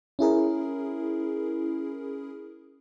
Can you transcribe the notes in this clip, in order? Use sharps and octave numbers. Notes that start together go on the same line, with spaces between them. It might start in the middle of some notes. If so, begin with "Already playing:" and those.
C#4 E4 G#4 A#4